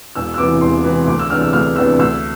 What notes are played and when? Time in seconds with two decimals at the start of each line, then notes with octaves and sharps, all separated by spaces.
0.15 E1 E6
0.34 E6
0.38 E2 C3 E3 D6
0.61 E1 C6
0.84 E2 C3 E3
1.07 D2 D6
1.19 E6
1.30 C3 E3 B3 D4 F6
1.41 E6
1.53 D2 F6
1.76 C3 E3 B3 D4 E6
1.99 D2 E6